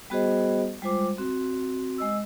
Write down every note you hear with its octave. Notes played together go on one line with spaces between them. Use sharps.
G3 B3 F#4 G#4 C5 D#5
G3 G#3 F4 C5 D6
C4 F#4
G#3 D#5 E6